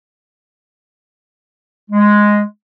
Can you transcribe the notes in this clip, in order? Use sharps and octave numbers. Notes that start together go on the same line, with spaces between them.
G#3